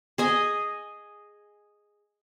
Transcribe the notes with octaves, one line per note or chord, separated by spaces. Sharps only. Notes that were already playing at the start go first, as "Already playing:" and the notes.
G#4 D#5 G#5